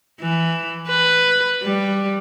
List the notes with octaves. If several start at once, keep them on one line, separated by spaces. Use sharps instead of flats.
E3
B4
G3